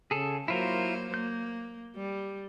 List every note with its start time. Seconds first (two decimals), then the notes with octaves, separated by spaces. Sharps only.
0.11 C#3 G#4 A4
0.48 F#3 A#3 E4 F4 A#4 C5
1.14 A#3 G6
1.95 G3